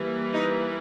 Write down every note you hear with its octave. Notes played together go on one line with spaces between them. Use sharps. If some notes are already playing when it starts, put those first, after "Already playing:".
Already playing: E3 G3 A#3
D#4